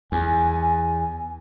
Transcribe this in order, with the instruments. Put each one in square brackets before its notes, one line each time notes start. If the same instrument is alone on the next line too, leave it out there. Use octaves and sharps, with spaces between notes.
[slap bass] E2 [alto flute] G#5